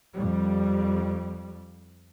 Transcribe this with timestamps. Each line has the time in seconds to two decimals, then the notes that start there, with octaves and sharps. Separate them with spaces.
0.15 F2 G3